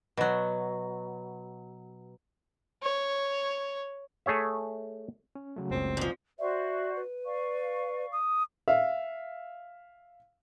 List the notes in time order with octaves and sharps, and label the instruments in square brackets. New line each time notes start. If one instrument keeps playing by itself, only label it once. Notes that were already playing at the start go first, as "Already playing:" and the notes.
[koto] B2 F#3
[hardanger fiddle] C#5
[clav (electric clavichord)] A3 G#4 C#5 E5
[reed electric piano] C#4
C#3 F#3 A3
[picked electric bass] F#1 C#2 [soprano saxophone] C4
[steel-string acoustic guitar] G#2 F3
[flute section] F#4 C5 D5 [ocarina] E5
[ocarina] B4
[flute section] D5 F5 C#6
[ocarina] D#6
[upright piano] E5 F5